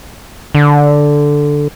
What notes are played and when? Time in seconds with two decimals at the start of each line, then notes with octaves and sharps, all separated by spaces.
0.55 D3